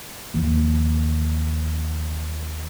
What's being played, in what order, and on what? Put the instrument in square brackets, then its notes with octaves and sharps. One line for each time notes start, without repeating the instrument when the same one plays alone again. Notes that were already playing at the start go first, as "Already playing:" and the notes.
[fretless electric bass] D#2 E3 F3 A#3